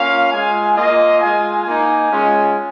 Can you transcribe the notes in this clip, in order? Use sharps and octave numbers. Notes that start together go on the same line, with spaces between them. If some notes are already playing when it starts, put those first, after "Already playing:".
Already playing: A#3 C#4 F4 F5
G#3 F4 G#5
A#3 F4 D#5
G#3 F4 G#5
A#3 D#4 G#5
G#3 C#4 F4